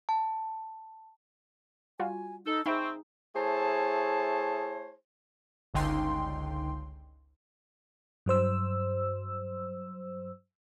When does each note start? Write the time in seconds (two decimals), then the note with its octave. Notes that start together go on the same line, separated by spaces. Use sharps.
0.09 A5
1.99 G3 F4 F#4 G#5
2.46 D#4 A4
2.66 C4 D#4 G#4 E5 G5 B5 C#6
3.36 A3 E4 G#4 C5 C#5 A5
5.74 G1 C#2 D3 D#4 G5 C6
8.26 G2 F#3 C5 E6